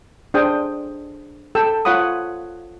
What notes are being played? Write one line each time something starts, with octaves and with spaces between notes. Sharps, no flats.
D4 G#4 C5 G5 D#6
A4 G5 E6
F4 C#5 F#5 B5 D#6